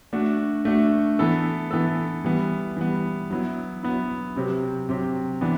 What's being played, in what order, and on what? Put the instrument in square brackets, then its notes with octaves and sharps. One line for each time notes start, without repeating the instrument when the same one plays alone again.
[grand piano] A3 D4 F#4
A3 D4 F#4
E3 B3 E4 A4
E3 B3 E4 A4
E3 G3 B3
E3 G3 B3
F#3 B3 E4
F#3 B3 E4
C3 F#3 C4 G4
C3 F#3 C4 G4
E3 B3 D4